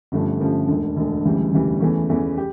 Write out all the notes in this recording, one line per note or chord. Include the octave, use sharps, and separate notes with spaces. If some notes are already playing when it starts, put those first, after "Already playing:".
G1 G2 F3 A3 C#4
G1 G2 F3 A3 C#4
E1 D2 D3
E1 D2 D3
E1 D2 C#3 E3 G3
E1 D2 C#3 E3 G3
E2 E3 A3 C#4
E2 E3 A3 C#4
G4